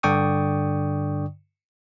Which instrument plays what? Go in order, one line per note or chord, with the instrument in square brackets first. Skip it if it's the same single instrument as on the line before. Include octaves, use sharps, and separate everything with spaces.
[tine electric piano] G2 D3 D5 G5 C#6 D#6